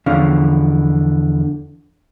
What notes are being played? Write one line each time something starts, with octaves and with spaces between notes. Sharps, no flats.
E2 D3 F3 C#4 F5